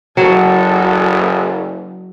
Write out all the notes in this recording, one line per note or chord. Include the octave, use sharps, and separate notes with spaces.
F#1 F#3 F#4 A4